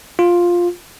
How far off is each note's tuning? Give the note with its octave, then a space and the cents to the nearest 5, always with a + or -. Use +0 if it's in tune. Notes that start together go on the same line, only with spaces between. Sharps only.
F4 +5